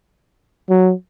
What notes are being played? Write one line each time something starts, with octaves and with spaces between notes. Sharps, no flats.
F#3